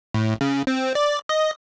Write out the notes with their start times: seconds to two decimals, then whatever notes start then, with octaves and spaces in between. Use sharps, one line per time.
0.14 A2
0.41 C#3
0.67 C4
0.95 D5
1.29 D#5